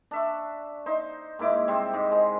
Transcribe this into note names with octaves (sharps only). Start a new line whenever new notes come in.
D4 E5 C#6
D#4 C5
G#2 A#3 E4 D6
C3 G3 C4 C5
G#2
G#3